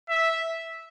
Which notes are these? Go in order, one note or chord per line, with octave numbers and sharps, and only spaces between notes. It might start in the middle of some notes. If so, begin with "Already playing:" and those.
E5